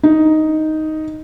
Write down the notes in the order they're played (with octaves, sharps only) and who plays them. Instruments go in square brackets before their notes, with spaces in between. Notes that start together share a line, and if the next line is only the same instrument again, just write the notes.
[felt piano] D#4